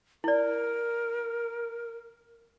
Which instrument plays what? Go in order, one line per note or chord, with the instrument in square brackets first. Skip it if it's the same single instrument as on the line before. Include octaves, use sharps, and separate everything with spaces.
[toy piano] E4 D5 [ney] A#4